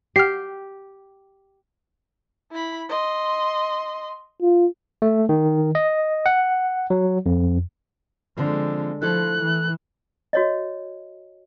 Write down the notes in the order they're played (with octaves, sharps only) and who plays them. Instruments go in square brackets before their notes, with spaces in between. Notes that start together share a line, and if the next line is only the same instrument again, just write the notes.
[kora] G4 [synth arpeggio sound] F6 C7
[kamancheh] E4 B5
D#5 C6
[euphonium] F4
[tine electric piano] A3
D#3
D#5
F#5
F#3
F2
[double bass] D3 G#3 [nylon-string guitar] F3 C4
[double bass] F3 [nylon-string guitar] A3 E4 A4 [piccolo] F#6
[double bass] E3
[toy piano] F#4 C#5 D#5